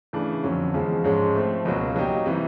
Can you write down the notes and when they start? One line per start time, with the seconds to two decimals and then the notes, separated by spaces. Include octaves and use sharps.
0.13 C#3 E3 A3 D4
0.43 F2 D3 F#3 A#3 C#4
0.74 E2 C#3 F3 G#3
1.04 G#2 F3 G#3 C#4
1.35 F3 A3 C4
1.65 C#2 B2 F#3 A#3
1.96 F#3 A#3 D#4 G4
2.26 C3 E3 G3